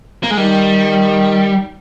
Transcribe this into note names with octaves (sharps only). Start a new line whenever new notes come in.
A#3
G#3
D#3 G3